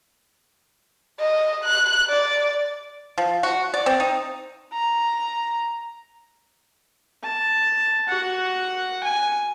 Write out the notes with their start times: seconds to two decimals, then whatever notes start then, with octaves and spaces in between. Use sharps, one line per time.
1.20 D#5
1.64 F#6
2.10 D5
3.18 F3
3.43 F#4
3.74 D5
3.86 C4
4.00 D#4
4.73 A#5
7.23 A5
8.08 F#4 F#5
9.04 G#5